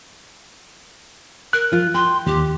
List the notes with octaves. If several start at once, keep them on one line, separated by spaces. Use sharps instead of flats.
A#4 F#6
F3 F4
G5 C6
D#2 G4